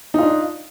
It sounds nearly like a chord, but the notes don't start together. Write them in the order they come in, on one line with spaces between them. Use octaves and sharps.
D#4 F4 D4